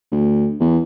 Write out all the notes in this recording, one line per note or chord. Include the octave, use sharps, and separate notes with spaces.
D2
E2